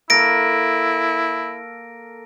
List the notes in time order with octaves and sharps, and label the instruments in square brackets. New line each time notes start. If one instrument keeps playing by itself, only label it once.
[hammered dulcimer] A#3 A4 [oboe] E4 [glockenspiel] A#6 D7